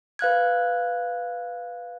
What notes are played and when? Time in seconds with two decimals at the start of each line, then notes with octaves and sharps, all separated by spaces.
0.19 B4 F5 F#6 G#6